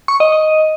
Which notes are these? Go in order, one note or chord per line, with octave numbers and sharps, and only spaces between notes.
C#6
D#5
D#5